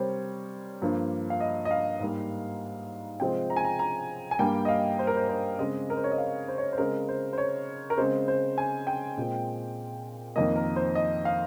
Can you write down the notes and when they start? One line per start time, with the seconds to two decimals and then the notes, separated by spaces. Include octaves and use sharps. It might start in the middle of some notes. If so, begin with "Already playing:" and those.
Already playing: C3 G3 C4 A#4 C5 C#5
0.82 G2 F3 A#3
1.30 F5
1.40 D#5
1.65 D#5
1.71 F5
2.00 G#2 G3 A#3
3.20 C3 F3 G#3 C4 G5
3.50 A#5
3.56 G#5
3.64 A#5
3.79 A#5
4.31 G#5
4.39 G2 G3 A#3 G5
4.65 D#5
4.68 F5
4.99 C5
5.07 A#4
5.17 C5
5.28 C5
5.58 C#3 G#3 C4 D#5
5.90 A#4
5.97 C5
6.04 C#5
6.12 D#5
6.18 F5
6.48 C5
6.58 C#5
6.73 C5
6.78 C#3 G#3 C4 A#4
7.08 C5
7.33 C5
7.38 C#5
7.90 A#4
7.97 C#3 G#3 C4 C5
8.28 C5
8.58 G#5
8.87 G5
9.17 A#2 G#3 C4
10.36 F2 D#3 A#3 D#5
10.56 A#4
10.76 C5
10.95 D#5
11.25 F5